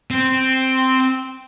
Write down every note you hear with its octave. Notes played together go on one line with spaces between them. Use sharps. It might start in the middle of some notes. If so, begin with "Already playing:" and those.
C4